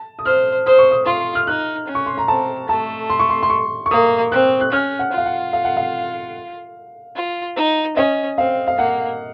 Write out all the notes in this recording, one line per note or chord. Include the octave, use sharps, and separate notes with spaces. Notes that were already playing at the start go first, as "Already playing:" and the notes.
Already playing: A5
D#6
C5 F6
C5 D#6
C#6
D#6
F4 C6
F6
D#4 F#6
C#4
C#6
C6
A#5
C4 A5
A3 A5
C6
C#6
C6
C6
C#6
C#6
A#3 D#6
C4 F#6
F#6
C#4 F6
F#5
F4
F5
F#5
F5
F#5
F5
F4
D#4
C#4 D#5
C4 F5
F5
A#3 F#5